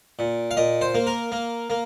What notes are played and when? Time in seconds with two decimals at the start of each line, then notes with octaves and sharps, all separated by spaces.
0.19 A#2
0.51 F5
0.57 A#2 D#5
0.81 C5
0.95 A#3
1.07 A#4
1.32 A#3
1.70 A#3